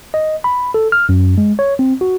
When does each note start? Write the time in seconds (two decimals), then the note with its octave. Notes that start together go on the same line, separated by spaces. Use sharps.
0.14 D#5
0.44 B5
0.74 A4
0.92 F6
1.09 F#2
1.38 G#3
1.59 C#5
1.79 C4
2.01 F#4